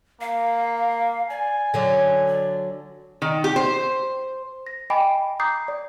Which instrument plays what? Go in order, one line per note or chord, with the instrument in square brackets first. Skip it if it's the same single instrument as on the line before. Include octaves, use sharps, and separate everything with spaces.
[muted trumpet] A#3 [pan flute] F5
[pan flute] D5 [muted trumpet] G#5
[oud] D3 F#3
[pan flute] D5
[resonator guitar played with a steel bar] D#3
G4
C5
[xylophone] A#6
D#5 G5 G#5 B5 D6 D7
A#5 D6 D#6 G6 C7
D5